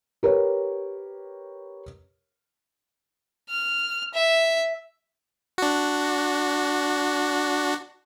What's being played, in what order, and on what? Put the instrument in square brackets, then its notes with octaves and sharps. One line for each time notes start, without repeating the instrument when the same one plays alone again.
[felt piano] G4 A#4 B4 C#5
[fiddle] F6
E5
[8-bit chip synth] D4 F#4